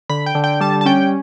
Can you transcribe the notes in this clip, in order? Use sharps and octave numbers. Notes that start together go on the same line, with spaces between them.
D3 B5
G5
D3
G5
G3 A5
A5
C#4 G5